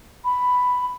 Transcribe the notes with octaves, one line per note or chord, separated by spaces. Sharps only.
B5